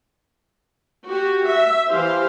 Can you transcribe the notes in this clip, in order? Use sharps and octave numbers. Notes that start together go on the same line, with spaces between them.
F#4 G4
E5
E3 G4 C5 F5